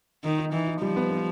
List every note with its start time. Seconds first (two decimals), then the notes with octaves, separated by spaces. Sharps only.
0.24 D#3 D#4
0.39 D#4
0.53 E3 D#4
0.67 D#4
0.82 F3 G3
0.96 B3
1.11 B3